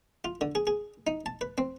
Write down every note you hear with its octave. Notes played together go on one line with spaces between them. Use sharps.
F4
D3
G#4
G#4
D#4
A5
B4
C4